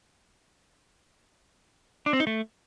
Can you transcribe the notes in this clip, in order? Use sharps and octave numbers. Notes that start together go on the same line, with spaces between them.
D4
C4
D#4
A3